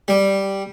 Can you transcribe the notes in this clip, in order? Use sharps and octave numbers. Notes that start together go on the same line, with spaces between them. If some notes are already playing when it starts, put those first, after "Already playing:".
G3